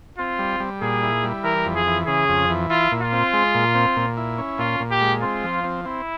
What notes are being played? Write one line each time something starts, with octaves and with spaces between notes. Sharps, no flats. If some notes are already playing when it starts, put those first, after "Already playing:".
C4 F4
G3
G3
A#2 G#4
E4
G3
E3 A#4
F2
G#4
E3
C#3 G#4
F2
E3
E4 F4
A#2
F4
C4
G#3
A#2
C4
A#2
E4
C#4
A#2 F4
A#2
G4
G#3
C4 F4
F3
C4
C4 E4